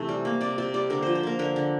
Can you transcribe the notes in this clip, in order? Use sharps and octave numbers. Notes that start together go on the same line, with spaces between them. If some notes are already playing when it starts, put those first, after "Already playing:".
Already playing: C3 E3 A3
G3
A#3
C3 D5
C3 D5
G3 D5
D3 A#4
F3 C5
C5
A#3 A#4
D3 A#4
D3